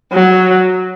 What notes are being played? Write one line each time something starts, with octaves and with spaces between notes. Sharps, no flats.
F#3